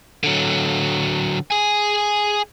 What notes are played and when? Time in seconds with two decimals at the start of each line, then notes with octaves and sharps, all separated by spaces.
0.24 D3 F#3
1.51 G#4 G#5